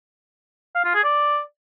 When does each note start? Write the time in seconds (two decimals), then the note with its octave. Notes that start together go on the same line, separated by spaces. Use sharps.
0.75 F5
0.85 F4
0.94 G#4
1.04 D5